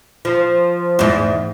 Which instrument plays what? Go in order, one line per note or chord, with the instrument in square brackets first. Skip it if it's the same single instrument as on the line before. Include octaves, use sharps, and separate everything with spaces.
[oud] F3
E2 G#2